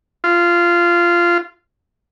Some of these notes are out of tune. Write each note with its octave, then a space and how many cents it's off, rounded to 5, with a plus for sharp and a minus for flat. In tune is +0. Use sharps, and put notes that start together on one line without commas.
F4 -15